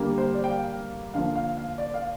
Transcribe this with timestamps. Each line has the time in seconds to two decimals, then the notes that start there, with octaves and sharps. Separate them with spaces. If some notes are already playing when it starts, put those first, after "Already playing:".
Already playing: D3 G3 A#3
0.18 C5
0.34 D5
0.44 G5
0.50 F5
1.14 D3 F3 A#3 F5
1.36 F5
1.57 F5
1.78 D5
1.94 F5